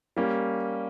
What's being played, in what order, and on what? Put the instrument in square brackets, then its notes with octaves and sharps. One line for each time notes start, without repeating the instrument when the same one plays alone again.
[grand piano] G3 A#3 C#4